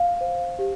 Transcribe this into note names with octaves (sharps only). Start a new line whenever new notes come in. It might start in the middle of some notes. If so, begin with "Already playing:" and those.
Already playing: F5
C5
G4